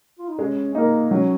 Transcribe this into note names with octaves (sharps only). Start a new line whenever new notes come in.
F4
D#4
G#3 C#4
A#3 D#4 A#4
F#3 C#4